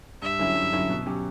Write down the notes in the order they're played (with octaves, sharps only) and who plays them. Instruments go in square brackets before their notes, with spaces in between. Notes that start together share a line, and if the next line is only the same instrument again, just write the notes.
[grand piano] G2 [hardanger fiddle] E5
[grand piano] D3 F#3 C#4 E4
G2
D3 F#3 C#4 E4
B2
F#3 C#4 G4